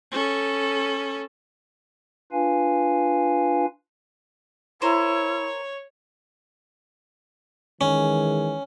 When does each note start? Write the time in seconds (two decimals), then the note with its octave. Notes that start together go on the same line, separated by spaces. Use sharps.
0.12 C#4 A4
2.32 D4 F4 B4 F5 G#5
4.82 E4 A#4 C5 C#5
7.81 D#3 E3 G#3 C#4